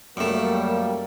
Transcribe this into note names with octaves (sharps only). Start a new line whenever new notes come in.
F#2 F#3 G3 A3 A#3